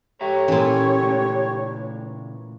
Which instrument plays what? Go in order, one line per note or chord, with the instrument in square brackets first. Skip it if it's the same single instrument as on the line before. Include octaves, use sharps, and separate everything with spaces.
[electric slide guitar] G#2 E5 A#5 [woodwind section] G4 A4 C#5
[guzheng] A#2 E3 [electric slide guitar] C#4
[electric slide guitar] C#3 A3